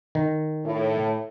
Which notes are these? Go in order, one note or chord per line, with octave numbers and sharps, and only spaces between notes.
D#3
A2